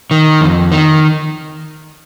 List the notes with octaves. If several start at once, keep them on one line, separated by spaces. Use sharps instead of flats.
D#3
F2
D#3